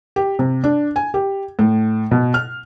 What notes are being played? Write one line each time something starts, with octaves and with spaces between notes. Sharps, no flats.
G4
C3
D4
G#5
G4
A2
B2
F6